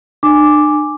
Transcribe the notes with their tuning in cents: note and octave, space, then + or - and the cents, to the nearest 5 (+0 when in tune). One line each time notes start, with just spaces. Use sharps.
D4 +40 G#5 -5 D6 +0